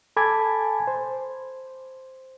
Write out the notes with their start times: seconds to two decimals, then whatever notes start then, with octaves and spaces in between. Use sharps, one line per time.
0.17 A4 G#5 A5 B5 D6 G#6
0.87 C5